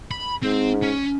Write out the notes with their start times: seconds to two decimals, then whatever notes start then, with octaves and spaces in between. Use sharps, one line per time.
0.11 B5
0.43 G#2 C4
0.83 C#4